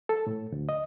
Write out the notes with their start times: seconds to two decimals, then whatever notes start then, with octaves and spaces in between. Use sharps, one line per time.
0.09 A4
0.27 A2
0.52 D2
0.69 D#5